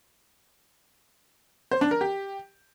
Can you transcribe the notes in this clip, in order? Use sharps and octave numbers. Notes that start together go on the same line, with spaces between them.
C5
D4
A#4
G4